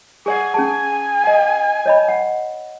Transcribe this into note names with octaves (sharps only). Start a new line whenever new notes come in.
G#4 D5 F#5 G#5
C#4 G#4 A5
D#5 F#5
C#5 D#5 B5
F#5